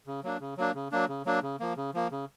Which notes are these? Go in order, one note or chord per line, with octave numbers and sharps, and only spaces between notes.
C#3
F#3 A#3 D4
C#3
F#3 A#3 D4
C#3
F#3 A#3 D4
C#3
F#3 A#3 D4
C#3
F3 A#3
C#3
F3 A#3
C#3